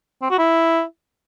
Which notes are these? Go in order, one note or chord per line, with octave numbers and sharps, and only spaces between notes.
C4
F#4
E4